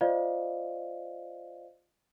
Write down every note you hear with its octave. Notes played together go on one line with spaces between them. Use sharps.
F4 C5 D5 D#5 F5